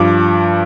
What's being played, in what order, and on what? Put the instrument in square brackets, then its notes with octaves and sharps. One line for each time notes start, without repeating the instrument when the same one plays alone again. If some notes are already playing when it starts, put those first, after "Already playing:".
Already playing: [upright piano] G2 F3 D6